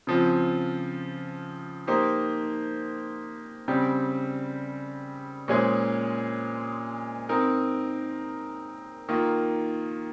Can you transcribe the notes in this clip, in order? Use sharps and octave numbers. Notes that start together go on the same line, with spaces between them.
C#3 F3 C4 F4
A#3 D#4 G4 C5
C#3 G3 C4 G4
A#2 G#3 C#4 G#4 C5
C4 D#4 A#4
D#3 A#3 F4